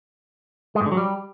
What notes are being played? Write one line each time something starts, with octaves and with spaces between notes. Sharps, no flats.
G#3
G#2
D3
F#3
G3